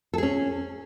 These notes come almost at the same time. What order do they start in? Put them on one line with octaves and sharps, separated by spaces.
A4 G#4 C#4